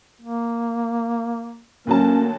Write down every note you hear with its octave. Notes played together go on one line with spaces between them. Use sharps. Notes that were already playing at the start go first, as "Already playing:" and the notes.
A#3
D2 F#3 A#3 C#4 A5